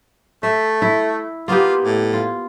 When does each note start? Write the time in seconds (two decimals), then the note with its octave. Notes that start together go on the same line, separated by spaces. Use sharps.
0.43 A3 E5
0.82 E4
1.48 A#3 B3 F4 G4
1.84 A2
2.13 F4